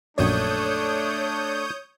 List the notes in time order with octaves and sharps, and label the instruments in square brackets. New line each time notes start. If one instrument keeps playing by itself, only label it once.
[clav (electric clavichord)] A#1 F#2 D5 [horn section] A3 D4 [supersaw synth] C#5 D#6 G6